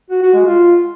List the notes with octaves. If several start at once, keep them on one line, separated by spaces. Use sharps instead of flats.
F#4
F#4
G#3
F4